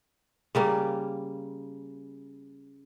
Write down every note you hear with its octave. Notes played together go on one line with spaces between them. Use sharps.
C#3 G3 A#3